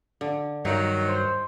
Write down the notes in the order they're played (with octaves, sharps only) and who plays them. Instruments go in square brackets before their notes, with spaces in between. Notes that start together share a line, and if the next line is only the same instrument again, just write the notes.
[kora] D3
[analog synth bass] G2 [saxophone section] D#3 F#3 [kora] D#4
[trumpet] C5